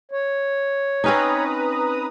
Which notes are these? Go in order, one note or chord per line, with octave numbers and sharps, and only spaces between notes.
C#5
C4 C#4 D#4 B4 A#5 D#6